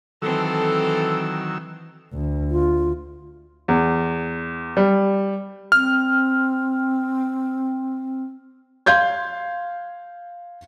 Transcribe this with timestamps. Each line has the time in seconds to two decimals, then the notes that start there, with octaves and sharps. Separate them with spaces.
0.22 D#3 E3 F#3 C4 A4 E6
2.13 D2
2.51 F4
3.68 E2
4.77 G3
5.72 C4 F6
8.86 F5 C6 G6 G#6